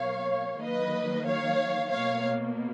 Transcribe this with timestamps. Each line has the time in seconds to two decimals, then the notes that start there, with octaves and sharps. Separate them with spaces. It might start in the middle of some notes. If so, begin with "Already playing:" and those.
Already playing: B2 F#3 A#3 C#5 F5
0.61 D#3 F#3 A#3 B4 D#5
1.25 C#5 F5
1.90 B2 A#3 C#5 F5